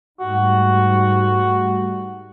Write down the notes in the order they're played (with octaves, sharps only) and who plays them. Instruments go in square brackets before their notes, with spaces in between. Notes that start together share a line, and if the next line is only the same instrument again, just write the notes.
[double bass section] G#2 G3 A3 [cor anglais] F#4